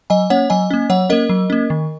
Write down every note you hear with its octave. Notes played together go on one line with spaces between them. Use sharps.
F#3 D#5 G#5
A#3 C#4 C#5 F#5
F#3 D#5 G#5
A#3 C#4
F#3 C#5 F#5
A#3 C#4 A#4 D#5
F#3
A#3 C#4
D#3